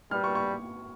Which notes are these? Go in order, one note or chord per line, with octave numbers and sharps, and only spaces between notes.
G3 F6
C#6
C#6